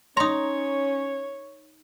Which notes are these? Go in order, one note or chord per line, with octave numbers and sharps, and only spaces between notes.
C#4 D#4 C#5 A#5 C6 D#6